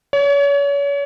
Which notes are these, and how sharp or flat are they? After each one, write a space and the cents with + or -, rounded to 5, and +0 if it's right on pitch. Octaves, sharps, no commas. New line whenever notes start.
C#5 +35